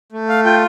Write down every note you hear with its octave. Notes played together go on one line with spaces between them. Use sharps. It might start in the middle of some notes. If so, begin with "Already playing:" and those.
A3
F5
F4 G5